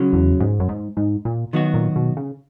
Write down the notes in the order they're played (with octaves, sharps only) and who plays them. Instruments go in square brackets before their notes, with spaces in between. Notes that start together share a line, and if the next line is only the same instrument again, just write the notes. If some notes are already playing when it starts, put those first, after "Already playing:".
Already playing: [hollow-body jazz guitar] C#3 F#3 C#4
[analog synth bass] E2
G#2
F#2
G#2
G#2
A#2
[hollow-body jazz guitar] D#3 F#3 B3 F#4
[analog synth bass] A#2
B2
C#3